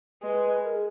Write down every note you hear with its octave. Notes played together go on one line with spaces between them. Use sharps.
G#3 B4
A#4
G#4